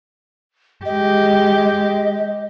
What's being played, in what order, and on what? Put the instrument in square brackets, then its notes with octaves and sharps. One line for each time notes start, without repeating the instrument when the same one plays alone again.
[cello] G#3 G4 [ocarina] D#5